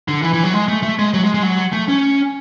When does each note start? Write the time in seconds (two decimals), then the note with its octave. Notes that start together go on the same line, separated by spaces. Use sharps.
0.08 D3
0.23 E3
0.34 E3
0.44 F#3
0.53 G#3
0.68 A3
0.83 A3
0.99 G#3
1.14 F#3
1.23 G#3
1.34 G#3
1.43 F#3
1.73 A3
1.88 C#4